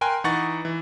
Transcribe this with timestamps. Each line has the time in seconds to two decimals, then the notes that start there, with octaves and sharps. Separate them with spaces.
0.01 A#4 G5 G#5 C6 F#6
0.24 E3 D#4 F#5 C#6 A6
0.65 E3